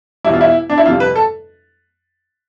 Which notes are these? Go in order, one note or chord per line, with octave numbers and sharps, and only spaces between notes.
E2 B2 G3 E4
F4
E4
D4
E4
F2 C3 G3 F4
B4
A4